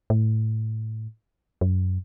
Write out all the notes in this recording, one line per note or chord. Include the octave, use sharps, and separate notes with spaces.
A2
F#2